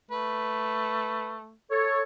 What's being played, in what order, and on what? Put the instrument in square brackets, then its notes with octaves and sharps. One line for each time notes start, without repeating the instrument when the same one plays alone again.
[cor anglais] A3 [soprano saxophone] B4
[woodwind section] A4 C#5